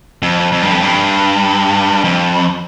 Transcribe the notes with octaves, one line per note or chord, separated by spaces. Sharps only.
F2
F2
G2
F2
G2
F2